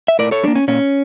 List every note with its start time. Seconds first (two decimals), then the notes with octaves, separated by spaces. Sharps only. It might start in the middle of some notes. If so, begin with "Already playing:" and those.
0.08 E5
0.19 A2 A#4 D5
0.31 A4 C#5
0.43 G3 A#3 D4
0.55 C#4
0.68 A#2 C#4